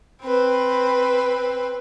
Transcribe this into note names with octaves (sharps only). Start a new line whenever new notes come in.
C4 B4